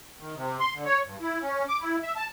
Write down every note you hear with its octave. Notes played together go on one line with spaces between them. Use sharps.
D#3
C3
C6
D3
C#5
G2
E4
C#4
D6
E4
E5
A5